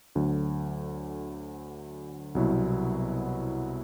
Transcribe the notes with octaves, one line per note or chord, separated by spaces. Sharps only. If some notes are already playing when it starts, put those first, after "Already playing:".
D2 D3 F#3
C2 B2 F#3 B3 E4